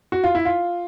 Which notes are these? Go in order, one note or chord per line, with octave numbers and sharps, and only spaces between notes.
F#4
F4
E4
F4